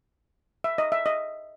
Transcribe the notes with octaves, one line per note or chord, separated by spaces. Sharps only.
E5
D#5
E5
D#5